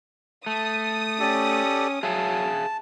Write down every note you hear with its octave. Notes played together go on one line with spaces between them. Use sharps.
A3 D#6
C#4 G4 A4 D5
F#3 G#4 E5 F5 A5